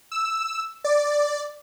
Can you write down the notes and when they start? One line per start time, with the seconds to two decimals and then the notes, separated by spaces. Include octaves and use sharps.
0.12 E6
0.84 D5